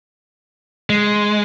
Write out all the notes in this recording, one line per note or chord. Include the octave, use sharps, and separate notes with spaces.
G#3